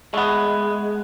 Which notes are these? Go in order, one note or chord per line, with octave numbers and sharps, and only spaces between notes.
G#3 A3 B3